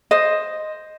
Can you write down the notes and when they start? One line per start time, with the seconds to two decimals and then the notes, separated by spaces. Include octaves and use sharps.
0.11 C5 D#5